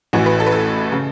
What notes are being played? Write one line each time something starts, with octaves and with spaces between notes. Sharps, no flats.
A1 A2 E3 F#4
B4
A4
B4
A4
C#3